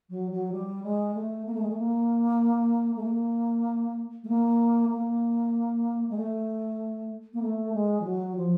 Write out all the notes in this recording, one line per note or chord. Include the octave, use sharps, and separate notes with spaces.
F#3
F#3
G3
G#3
A3
A#3
A3
G#3
A3
A#3
A3
A#3
A3
A#3
A#3
G#3
A3
A#3
A3
G#3
F3
F#3
F3